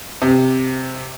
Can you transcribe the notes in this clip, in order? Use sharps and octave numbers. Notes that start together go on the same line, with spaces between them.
C3